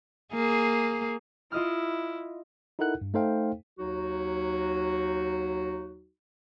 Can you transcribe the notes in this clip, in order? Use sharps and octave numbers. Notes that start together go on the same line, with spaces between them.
A#3 G#4
E4 F4 D#5 F6
D#4 E4 A4 A#4 F#5 F#6
G2
A3 D#4 A4 C5 F5 G5
D#2 F#3 D#4 F#4